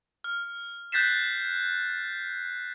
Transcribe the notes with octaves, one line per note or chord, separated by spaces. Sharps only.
F6
F#6 G6 A6 B6 C7 E7